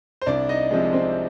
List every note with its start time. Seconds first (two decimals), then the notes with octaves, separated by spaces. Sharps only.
0.22 C5
0.26 C2 D4 D5
0.49 D#4 D#5
0.71 C3 F3 G#3
0.93 C4 C5